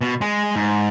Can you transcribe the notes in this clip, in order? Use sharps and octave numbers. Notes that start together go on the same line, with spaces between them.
B2
G#3
G#2